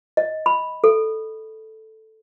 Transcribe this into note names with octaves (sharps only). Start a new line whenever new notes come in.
D#5
B5
A4